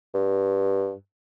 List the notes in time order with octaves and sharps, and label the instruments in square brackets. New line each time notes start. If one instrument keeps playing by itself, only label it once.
[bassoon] G2